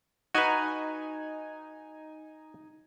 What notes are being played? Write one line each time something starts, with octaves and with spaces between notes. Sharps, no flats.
D#4 F#4 B4 G#5